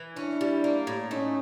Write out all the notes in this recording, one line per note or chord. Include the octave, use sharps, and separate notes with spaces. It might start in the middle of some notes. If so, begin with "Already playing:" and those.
Already playing: E3
C#4 D4 E4
G3
A#3
A2
A3 C#4 D#4